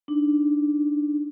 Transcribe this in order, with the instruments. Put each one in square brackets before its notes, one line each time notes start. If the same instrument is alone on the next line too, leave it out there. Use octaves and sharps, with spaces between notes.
[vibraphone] D4 D#4